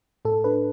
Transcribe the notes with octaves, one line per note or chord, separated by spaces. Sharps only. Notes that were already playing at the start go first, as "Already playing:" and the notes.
A2 A4
D4 B4